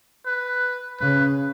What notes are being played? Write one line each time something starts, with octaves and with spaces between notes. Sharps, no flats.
B4
C#3 B4